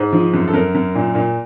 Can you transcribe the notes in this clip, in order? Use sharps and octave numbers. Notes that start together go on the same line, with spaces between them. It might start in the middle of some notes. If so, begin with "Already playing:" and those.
Already playing: G#2 C5
F3
F#2
A4
F#2 A#4
F#2
A#2
A#2